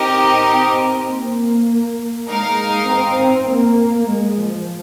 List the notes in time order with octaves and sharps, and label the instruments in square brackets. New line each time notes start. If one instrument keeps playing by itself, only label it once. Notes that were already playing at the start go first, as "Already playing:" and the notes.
Already playing: [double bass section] C4 [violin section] D#4 G4 A#4 D#5
[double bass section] A#3
[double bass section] G#3 [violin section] D#4 A#4 F5
[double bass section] C4
A#3
G#3
F3